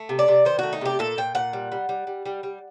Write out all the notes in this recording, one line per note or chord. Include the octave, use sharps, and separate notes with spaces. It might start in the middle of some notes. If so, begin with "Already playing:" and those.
Already playing: A3
C3
D5
C3
D#3 C5
A3 F#4
D#4
C3 G4
A#2 A4
A#2 G5
A#2 F#5
G3
G3
G3
G3
G3
G3